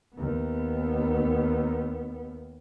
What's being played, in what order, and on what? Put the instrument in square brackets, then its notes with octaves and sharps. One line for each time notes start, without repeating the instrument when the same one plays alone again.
[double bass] D#2 B3